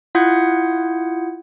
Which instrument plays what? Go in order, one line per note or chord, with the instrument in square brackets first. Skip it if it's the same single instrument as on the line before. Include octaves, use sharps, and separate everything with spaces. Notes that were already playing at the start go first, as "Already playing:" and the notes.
[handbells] E4 F4 F#5 D#6 G6 G#6